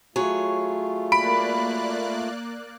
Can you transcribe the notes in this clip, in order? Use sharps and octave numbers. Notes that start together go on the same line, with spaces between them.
F#3 A3 F4 G#4 C#5
A#3 D5 B5 F#6 D7